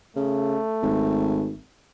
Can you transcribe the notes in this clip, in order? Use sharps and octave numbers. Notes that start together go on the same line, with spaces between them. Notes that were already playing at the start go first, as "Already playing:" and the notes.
C#3 A3
G#1